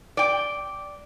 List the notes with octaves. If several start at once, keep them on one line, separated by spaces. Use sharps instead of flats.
D5 G5